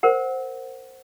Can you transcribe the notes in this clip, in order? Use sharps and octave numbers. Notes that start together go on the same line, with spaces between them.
A#4 C5 F#5